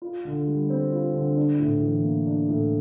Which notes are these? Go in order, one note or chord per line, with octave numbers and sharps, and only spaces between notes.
F4
D3
G3
C4
F4
D3
D4
A2
E3
A#3
D4
A2